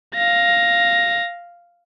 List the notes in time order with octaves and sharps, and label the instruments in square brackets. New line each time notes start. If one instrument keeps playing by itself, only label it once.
[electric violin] F5 A#6